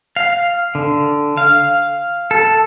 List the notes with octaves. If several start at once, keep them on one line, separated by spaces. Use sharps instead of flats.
F5
D3
F5
A4